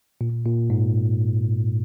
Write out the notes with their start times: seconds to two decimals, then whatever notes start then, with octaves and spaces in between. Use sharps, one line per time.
0.21 A#2
0.45 A#2
0.70 G#2